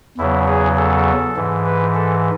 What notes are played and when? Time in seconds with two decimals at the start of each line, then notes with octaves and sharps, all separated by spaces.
0.18 E2 C#3 F#3 E4
0.47 G#4
0.77 A4
1.36 G#2 E3
1.65 B4
1.95 A4